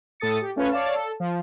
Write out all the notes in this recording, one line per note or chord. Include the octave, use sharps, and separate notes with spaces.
A2 A4 D#6 A6 C#7
G4
A3 C#4 F4 B4 C#5
C#5 D5 F5 A5
A4
F3